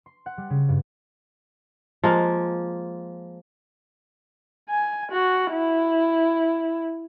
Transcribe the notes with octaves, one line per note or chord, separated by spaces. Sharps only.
C6
F#5
G3
C#3
G2
F3 G#3 A#3
G#5
F#4
E4